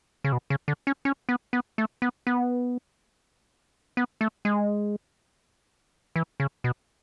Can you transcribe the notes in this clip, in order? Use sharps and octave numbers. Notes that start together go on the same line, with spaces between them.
C#3
B2
C#3
D3
C#4
C#4
B3
B3
A3
B3
B3
B3
A3
G#3
E3
C#3
B2